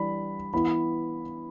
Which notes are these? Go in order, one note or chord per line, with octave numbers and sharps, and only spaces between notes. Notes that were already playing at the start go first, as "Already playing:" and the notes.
Already playing: E3 G3 D4 B5
E3 B3 E4 B5